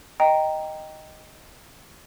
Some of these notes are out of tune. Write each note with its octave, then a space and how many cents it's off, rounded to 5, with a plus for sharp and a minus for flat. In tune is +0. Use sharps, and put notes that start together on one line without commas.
D#5 +0 G5 +0 A#5 +0